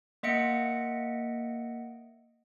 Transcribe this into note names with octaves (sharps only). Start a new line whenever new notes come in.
A#3 D#5 E5 F#5 C#7 D7